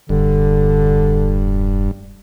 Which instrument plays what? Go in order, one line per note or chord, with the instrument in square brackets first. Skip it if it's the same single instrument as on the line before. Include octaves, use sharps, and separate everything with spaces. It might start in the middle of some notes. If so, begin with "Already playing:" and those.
[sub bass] E1 [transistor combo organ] G2 [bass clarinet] D3